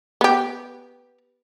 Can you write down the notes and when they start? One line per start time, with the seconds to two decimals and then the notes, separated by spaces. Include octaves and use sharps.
0.21 B3 G4